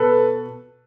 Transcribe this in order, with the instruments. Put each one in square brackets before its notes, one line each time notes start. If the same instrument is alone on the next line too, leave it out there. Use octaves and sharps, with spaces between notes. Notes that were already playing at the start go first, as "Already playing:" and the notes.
Already playing: [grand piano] B2 B3 A4 B4